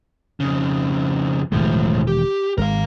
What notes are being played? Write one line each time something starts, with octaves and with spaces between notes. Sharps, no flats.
F2 C#3
E1 A2 D#3 F3 G#3
G4
G#1 G#3 A#4 F5